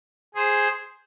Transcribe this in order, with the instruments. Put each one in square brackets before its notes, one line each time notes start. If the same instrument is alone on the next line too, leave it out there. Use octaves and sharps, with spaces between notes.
[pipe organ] G#4 C5